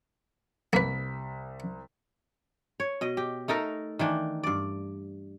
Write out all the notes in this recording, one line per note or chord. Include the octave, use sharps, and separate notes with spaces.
C2 A#3 B4 B6
C#5
B2 D#5
G4
A3 D#4 A4 A#4
D#3 E3 D4
G2 D5